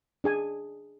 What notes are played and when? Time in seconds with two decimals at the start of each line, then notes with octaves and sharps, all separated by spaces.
0.24 D4 G#4 G#5